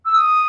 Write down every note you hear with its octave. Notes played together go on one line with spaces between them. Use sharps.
E6
D#6